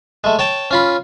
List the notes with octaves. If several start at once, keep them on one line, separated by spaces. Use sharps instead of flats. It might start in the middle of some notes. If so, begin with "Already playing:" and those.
G#3 A3
C#5 G5 A5
C#4 F4 B5